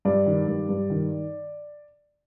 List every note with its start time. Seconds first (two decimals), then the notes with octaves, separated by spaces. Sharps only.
0.05 G2 D5
0.26 D#3
0.47 G2
0.69 G2
0.90 D#3